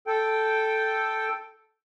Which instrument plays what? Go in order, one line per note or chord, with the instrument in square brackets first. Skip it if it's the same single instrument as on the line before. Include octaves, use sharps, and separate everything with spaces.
[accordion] A4 G5